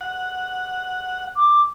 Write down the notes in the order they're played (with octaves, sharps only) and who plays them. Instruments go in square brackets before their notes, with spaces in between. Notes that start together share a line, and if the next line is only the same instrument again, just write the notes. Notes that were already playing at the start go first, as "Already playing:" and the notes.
[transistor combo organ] F#5
[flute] D6